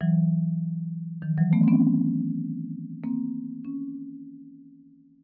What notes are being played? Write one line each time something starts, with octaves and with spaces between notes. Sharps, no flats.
E3 F#3
D#3 F3
E3 F#3
A3 B3
C4
B3 C#4
A#3 C4
C#4